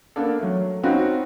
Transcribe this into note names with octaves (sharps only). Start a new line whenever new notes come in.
A#3 B3 D4 A4
F#3 A3
C4 C#4 D#4 F4 F#4 B4